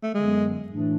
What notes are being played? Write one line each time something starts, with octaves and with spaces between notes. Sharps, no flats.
A3
F#2 D3 F#3 G#3 B3
A2 E3 A3 D4